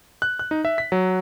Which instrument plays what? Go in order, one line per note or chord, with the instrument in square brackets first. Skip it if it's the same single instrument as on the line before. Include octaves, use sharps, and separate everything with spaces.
[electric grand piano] F#6
F#6
D#4
E5
B6
F#3